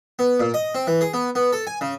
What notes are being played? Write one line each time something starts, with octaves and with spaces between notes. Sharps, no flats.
B3
A#2
D#5
C4
E3
G#4
B3
B3
A4
G#5
C#3